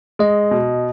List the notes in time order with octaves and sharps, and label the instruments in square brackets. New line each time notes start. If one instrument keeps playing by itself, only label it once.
[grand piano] G#3 [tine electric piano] D#5
[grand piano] B2